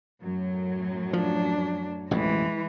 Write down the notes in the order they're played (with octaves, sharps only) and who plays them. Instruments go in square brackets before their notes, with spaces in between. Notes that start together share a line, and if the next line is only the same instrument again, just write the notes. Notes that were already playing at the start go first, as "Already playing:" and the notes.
[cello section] F#2 A2 F#3
[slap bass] F3 [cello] D4
[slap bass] A1 F2 B2 [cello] E3 G#3